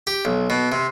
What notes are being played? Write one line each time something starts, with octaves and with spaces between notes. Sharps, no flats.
G4
B1
B2
C3